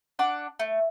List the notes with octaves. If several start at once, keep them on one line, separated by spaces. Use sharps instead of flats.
D4 F#5 D6
A3